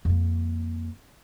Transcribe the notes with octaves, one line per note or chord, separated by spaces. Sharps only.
F2 A#3